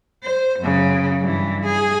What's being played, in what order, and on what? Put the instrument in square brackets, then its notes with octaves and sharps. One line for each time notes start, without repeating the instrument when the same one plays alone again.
[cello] C5
F#2 C#3
G2 E3
G#4